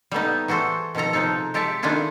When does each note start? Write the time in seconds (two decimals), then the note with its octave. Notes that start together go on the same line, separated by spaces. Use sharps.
0.12 G3 A3 B3 D#4
0.48 E3 F#4 G#4 A4 C5
0.95 B2 D#3 F3 A4 A#5
1.13 C3 F3 D#4 G#4 A4
1.54 G#3 G4 A4 D5 E5 A5
1.83 D#3 D4 E4 F4 G#4 A4